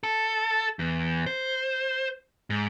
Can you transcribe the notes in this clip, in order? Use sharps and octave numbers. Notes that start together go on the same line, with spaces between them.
A4
E2
C5
G#2